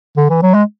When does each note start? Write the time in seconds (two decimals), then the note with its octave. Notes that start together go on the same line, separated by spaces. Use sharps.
0.17 D3
0.30 E3
0.42 F#3
0.54 G#3